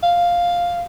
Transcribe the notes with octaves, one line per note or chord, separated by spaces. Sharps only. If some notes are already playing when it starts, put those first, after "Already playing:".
F5